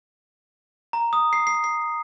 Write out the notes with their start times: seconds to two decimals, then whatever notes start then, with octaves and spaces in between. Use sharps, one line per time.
0.93 A#5
1.13 D#6
1.33 C7
1.47 C7
1.64 C7